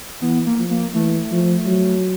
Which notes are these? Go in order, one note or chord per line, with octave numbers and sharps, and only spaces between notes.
E3 B3
A#3
F3
A#3
E3 A3
F3
F#3